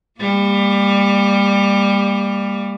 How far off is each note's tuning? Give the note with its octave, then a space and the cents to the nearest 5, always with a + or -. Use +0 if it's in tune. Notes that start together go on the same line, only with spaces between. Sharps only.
G3 +25 A#3 -10